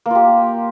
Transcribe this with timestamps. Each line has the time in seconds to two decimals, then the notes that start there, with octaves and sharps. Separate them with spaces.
0.06 A#3
0.10 F4
0.15 G4